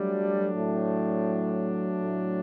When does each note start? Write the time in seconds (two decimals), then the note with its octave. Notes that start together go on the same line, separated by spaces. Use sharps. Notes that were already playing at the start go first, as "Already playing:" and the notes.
Already playing: F#3 G3 A3 D4
0.56 A2
2.01 A2